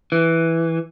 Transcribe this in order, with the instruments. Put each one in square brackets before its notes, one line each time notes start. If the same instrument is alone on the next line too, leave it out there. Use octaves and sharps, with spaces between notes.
[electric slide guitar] E3